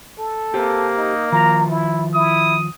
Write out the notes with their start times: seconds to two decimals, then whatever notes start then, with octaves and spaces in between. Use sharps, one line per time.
0.19 A4
0.54 A#3 G4 C5
0.97 D#4
1.32 D#3 F3 A#5
1.70 E4
2.15 E4 D#6